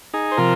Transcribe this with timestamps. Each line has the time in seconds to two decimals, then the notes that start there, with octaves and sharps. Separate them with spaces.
0.14 D#4 G#4
0.32 C5
0.37 C3 F3 F4 A#4